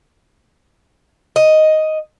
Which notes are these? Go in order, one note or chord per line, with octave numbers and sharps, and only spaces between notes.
D#5